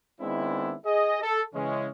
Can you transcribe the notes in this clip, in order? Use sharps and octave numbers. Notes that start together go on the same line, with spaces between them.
D#3 G#3 B3 C4 D4 E4
G#4 D#5
A4
C#3 E3 G#3 C#4